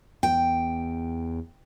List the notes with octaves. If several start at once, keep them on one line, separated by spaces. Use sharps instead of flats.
E2 G5